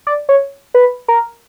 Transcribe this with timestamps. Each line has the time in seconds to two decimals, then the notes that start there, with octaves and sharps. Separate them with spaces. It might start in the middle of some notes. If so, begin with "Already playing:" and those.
0.07 D5
0.29 C#5
0.74 B4
1.08 A#4